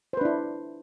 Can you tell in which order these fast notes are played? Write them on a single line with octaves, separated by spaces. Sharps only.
C5 B4 D4 E4